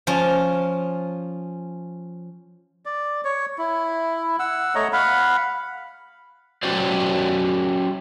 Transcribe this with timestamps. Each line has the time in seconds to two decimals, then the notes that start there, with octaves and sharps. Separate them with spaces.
0.07 F3 C#4 F4
2.86 D5
3.25 C#5
3.58 E4
4.39 F#5 E6
4.75 A3 C#5 D#5 A#5
4.93 F5 F#5 B5
6.63 F#3 C#4 F#4 G4 C5 D5